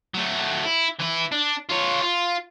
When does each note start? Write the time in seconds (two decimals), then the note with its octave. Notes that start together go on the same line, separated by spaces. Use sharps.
0.14 F#3 A3
0.65 E4
1.00 E3 E4
1.32 D4
1.69 F4 C#5
2.02 F4